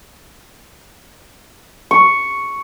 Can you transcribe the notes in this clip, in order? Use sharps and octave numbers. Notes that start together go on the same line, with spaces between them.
C#6